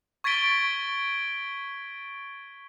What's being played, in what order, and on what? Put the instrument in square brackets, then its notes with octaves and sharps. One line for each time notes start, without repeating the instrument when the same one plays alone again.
[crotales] C#6 G#6 A6 B6 D7 G7